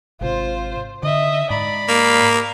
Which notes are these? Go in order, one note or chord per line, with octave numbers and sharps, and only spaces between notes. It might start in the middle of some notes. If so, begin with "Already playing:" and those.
G#1 C3 F4 C5
D3 D#5 E5
G#2 D5 A#5 B5
A#3